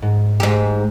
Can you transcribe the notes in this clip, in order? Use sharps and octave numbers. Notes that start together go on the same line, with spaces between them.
G#2
G#2 G4 A#5 E6